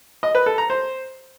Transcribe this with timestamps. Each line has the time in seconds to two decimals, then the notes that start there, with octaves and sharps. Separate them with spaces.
0.23 D#5
0.35 B4
0.46 A4
0.58 A#5
0.70 C5